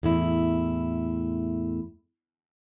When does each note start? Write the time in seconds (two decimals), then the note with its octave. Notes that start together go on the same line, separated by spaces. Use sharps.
0.03 E2 A2 E4